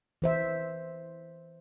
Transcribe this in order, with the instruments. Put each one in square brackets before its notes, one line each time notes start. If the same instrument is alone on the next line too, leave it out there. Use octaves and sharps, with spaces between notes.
[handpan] E3 C5 E5